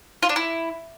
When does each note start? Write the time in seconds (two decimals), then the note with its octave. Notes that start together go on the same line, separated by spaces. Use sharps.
0.23 F4
0.29 D4
0.36 E4